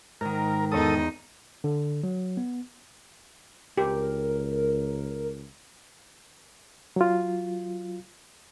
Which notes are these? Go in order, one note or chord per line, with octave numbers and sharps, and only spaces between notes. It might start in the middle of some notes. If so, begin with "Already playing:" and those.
G#2 D#3 A#4
E2 D#4 A4 D#6
D3
F#3
B3
C#2 G4 A#4
F#3 F4